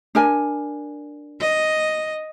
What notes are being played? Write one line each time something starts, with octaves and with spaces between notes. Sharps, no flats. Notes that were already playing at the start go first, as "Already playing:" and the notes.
D4 A#4 G#5
D#5